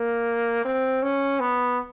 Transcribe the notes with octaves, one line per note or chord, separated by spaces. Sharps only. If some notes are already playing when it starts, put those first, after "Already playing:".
Already playing: A#3
C4
C#4
B3